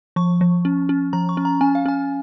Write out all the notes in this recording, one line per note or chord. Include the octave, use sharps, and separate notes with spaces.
F3 C#6
F3
C#4
C#4
F3 A#5
C#6
C#4
A#5
C#4 G#5
F5
C#4 G#5